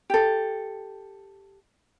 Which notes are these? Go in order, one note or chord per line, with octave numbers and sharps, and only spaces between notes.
G4 A4